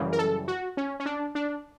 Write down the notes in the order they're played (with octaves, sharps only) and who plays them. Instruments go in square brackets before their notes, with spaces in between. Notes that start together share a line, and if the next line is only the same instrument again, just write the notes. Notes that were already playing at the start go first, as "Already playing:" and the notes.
Already playing: [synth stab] F#2 C#3 E3 G3
A#4
A4
F#4
C#4
C#4
D4
D4